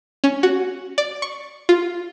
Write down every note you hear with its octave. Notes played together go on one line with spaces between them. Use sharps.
C#4
F#4
D5
C#6
F4